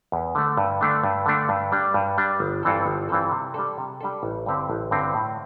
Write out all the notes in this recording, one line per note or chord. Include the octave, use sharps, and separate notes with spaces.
E2
D3 A3
G2
D3 A3 D4
G2
D3 A3 D4
G2
G3 D4
G2
G3 D4
G1
G2 E3 C4 A4
G1
G2 E3 C4 A4
C3
G3 D4 A4
C3
G3 D4 A4
A1
G2 D3 C4 G4
A1
G2 D3 C4 G4
A2